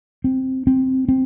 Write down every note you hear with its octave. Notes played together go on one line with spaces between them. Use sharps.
C4
C4
C4